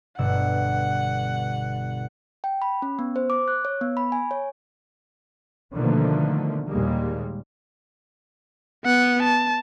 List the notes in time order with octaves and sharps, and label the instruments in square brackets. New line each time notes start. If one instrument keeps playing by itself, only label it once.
[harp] G1 B2 E6 [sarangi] F#5
[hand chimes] G5
B5
C#4
B3
C5
D6
F#6
C#5
B3
B5
G#5
C#5
[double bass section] B2 D3 D#3 F3 A3 A#3
D#2 A#2 G3 G#3 A#3
[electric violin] B3 F#5
A5